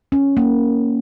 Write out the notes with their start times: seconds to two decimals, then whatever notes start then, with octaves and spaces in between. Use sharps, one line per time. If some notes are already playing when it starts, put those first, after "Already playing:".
0.12 C#4
0.37 A#3